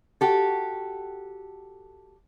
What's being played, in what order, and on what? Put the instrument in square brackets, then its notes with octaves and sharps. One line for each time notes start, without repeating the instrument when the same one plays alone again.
[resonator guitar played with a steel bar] F#4 G4 A4